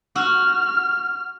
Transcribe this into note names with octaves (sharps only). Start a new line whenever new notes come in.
F#4 F6